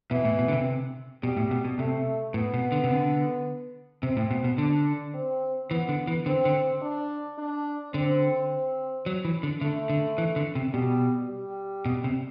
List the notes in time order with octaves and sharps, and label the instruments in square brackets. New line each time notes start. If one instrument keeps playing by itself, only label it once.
[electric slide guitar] B2 [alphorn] E3
[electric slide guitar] A2
B2
D3
C3
[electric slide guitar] B2 [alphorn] G3
[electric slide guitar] A2
B2
B2
[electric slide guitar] C3 [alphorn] A3
[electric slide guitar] A2 [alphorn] B3
[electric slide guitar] B2
D3
C3
D3
[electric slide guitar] C3 [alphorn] C4
[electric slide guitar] A2
B2
B2
[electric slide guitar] D3 [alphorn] D4
[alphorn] C4
[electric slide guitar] E3 [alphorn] B3
[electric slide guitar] D3
E3
[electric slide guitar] D3 [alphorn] C4
[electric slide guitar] D3
[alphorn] D4
D4
[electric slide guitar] D3 [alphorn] C4
[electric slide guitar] F#3
E3
D3
[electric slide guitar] D3 [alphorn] A3
[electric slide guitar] D3
E3
D3
C3
[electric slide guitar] B2 [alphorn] G3
[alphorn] G3
[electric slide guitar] B2
C3